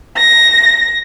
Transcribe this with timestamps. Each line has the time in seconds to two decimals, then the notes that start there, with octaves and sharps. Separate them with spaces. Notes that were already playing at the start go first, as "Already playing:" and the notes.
0.17 A#6